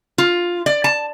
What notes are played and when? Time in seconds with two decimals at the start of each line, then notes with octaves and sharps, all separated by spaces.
0.18 F4
0.66 D5
0.84 A5